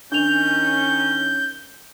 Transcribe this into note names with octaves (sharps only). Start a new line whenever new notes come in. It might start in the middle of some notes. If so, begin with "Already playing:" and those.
D#3 C#4 D4 G6 F7